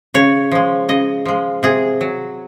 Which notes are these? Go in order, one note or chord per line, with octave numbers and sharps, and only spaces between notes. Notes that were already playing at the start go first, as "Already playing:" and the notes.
C#3 C#5
F3 G#3
C#3 D#5
F3 G#3
C3 G#4
F#3